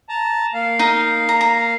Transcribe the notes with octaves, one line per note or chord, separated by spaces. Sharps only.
A5 A#5
A#3 F5
D#4
A#5
A#5